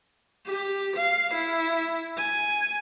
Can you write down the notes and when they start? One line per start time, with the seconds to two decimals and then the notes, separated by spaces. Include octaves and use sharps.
0.46 G4
0.96 F5
1.34 E4
2.17 G#5